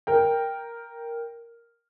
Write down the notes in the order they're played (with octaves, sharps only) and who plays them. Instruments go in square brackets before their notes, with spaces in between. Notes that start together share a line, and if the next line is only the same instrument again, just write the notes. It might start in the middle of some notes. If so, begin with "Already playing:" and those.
[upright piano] A#4 G5